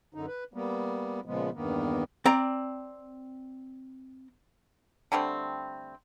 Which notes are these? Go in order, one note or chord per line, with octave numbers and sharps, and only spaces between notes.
F#2 D3 D#4
B4
G3 A#3 B3
A#2 C#3 F3 G#3 B3
E2 G2 D#3 A#3 B3
C4 D5 A#5
D3 G3 A3 C4